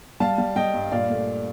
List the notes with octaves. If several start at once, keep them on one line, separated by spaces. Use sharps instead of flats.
G3 F5 A5
G3
G3 D#5 G5
G2
A#2 D5 F5
A3